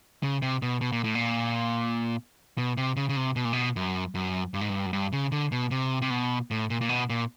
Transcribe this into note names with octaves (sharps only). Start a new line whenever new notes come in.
C#3
C3
B2
B2
A#2
A2
A#2
B2
C3
C#3
C#3
C3
B2
A#2
B2
F#2
F#2
G2
G#2
G2
F#2
G2
C#3
D3
B2
C3
C3
B2
A2
A#2
A#2
B2
A#2